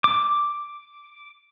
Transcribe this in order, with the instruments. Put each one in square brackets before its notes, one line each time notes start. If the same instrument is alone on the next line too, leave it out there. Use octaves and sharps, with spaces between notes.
[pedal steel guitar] D6